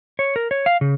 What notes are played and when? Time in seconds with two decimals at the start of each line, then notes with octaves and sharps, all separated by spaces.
0.19 C#5
0.36 A#4
0.51 C#5
0.66 F5
0.81 C#3